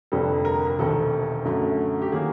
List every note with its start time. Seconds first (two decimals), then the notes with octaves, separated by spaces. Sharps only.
0.12 F1 F2 D3 G3 A4
0.45 A#4
0.67 A#4
0.78 E1 D2 C3 D#3 A4
1.45 F#2 D3 F#3 A3
2.02 G4
2.12 D#3 F#3 A#3 G#4